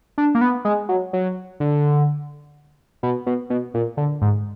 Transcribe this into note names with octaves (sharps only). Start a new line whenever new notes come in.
D4
A#3
B3
G#3
F#3
F#3
D3
B2
B2
B2
A#2
D3
G#2